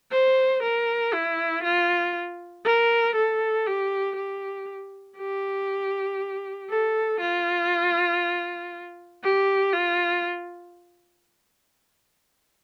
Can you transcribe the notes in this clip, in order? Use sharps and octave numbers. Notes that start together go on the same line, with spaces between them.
C5
A#4
E4
F4
A#4
A4
G4
G4
G4
A4
F4
G4
F4